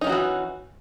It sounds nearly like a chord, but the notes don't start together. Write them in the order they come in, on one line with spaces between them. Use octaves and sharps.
D#4 C#4 D#3 F#4 E3